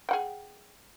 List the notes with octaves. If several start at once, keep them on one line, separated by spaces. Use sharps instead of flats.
G#4 F#5 G5